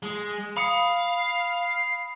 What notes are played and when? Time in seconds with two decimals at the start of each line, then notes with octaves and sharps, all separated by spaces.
0.03 G#3
0.57 F5 B5 D#6 C#7